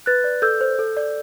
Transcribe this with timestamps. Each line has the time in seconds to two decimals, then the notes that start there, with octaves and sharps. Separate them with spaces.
0.06 B4 F#6 A6
0.24 D5
0.42 A4 E6 G6
0.61 C5
0.79 A4
0.97 D5